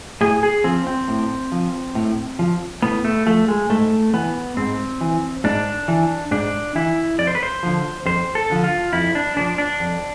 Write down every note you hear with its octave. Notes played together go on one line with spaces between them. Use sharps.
A2 G#4
G#4
F3 C4
C4
A2
F3
A2
F3
A2 B3
A3
F3 A3
G#3
G#2 A3
E3 B3
G#2 C4
E3
G#2 D4
E3
G#2 D4
E3 E4
F2 D5
C5
B4
C5
D3 F3
F2 C5
A4
D3 F3
F4
F2 E4
D4
D3 F3 D4
D4
F2